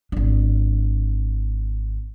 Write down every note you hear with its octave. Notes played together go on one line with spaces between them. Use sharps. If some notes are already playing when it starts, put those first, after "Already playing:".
G#1 D4